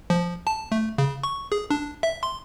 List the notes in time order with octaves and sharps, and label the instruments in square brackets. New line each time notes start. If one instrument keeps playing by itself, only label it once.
[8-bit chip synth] F3
A5
A3
C#3
C#6
G#4
D4
E5
C6